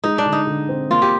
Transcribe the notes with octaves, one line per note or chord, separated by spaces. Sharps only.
G#3 D#4
D4
D3
D#4
D3
C4
A#3 F4
G4